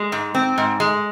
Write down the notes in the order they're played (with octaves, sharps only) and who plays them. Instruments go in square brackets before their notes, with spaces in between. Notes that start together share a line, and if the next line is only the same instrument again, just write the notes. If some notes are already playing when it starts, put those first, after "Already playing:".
Already playing: [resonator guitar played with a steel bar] G#3
G#2
C4
G#2
G#3